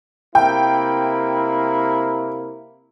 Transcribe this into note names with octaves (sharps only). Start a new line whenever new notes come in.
C3 A#3 E4 G5